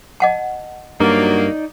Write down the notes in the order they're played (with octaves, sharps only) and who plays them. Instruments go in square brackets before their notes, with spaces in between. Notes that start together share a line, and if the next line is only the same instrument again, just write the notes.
[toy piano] D#5 F#5 A5
[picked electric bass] G2 [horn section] F#3 A#3 [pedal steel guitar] D#4 D5